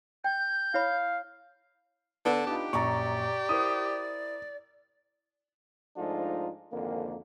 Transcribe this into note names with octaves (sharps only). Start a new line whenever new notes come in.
G5 G6
E4 C#5 F5 B5
D3 B3 A5
D4 D#4 F4 G4
A#1 F#2 D5 A#5 C#6
E4 A#4 C5 D#6
G#2 F3 A3 D4 D#4 F4
G#1 F2 D3 A#3